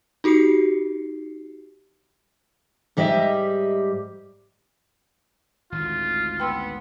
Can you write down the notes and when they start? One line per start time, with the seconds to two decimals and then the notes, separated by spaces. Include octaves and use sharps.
0.24 D#4 F#4 G4 C7 C#7
2.97 G#2 G3 G4 D#5 E5
5.72 G#1 D2 A2 F4
6.40 B3 G5 C6 E6